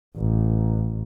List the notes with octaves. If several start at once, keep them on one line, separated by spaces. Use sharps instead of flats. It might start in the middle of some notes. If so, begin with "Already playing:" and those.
A1